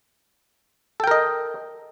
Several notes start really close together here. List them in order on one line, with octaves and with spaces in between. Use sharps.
A4 G5 A#4 D#5